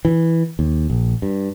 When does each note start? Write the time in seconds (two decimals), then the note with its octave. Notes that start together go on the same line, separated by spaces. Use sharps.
0.05 E3
0.59 D#2
0.90 A#1
1.22 G2